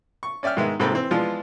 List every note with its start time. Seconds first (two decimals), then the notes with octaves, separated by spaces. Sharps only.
0.23 C#6
0.43 C#4 D5 E5 G5 F6
0.57 G#2 D#3 G#3 B3 E5
0.80 G#2 C3 A#3 C4 A4 B5
0.92 E3 C4
1.11 E3 F3 G#3 B3 D4 F4